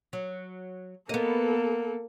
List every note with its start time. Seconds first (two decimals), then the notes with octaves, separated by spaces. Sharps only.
0.13 F#3
1.09 A#3 B3 A4 D#5